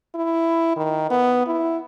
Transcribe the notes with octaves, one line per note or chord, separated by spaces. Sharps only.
E4
D#3
B3
E4